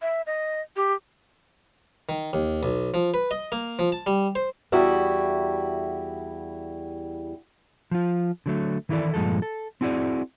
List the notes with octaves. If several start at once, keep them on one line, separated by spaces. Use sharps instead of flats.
E5
D#5
G4
D#3
D#2
B1
F3
B4
D#5
A#3
F3
A5
G3
C5
E2 G3 E4 F#4
F3 F4
D3 F#3 A3
D#3 E3 E4 A4 D5
G2 A#2 F3 G#3 A4
A4
C4 E4 F#4 G#4 D5